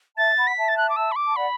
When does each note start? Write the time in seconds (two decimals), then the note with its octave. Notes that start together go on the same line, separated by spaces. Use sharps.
0.17 E5 A5 A6
0.37 F#5 B5
0.47 B6
0.57 E5 A5
0.68 A6
0.77 F#6
0.89 D6
0.96 E6
1.12 B5
1.16 D6
1.28 A5
1.36 D5 F#5 B5